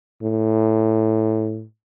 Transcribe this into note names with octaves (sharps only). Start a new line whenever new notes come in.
A2